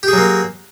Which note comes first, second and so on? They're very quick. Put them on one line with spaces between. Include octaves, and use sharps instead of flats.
G4 G#4 F#3 A#3